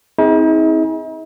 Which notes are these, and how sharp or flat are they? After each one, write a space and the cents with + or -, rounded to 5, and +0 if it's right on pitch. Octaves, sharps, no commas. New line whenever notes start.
C4 +0 D#4 +45 G#4 +0